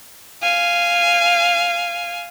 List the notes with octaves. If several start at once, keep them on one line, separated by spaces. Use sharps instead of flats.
F5 G#5